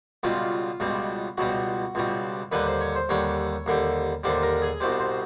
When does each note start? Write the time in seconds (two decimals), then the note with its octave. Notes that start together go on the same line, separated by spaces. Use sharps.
0.23 C#2 B2 G3 F4
0.80 C#2 B2 G3
1.38 C#2 B2 G3 F#4
1.95 C#2 B2 G3
2.52 D#2 D3 G3 B4
2.67 C5
2.81 C#5
2.95 C5
3.09 D#2 D3 G3 C#5
3.66 D#2 D3 G3
4.23 D#2 D3 G3 C5
4.43 A#4
4.62 G#4
4.80 C2 B2 G3 C5
5.00 C5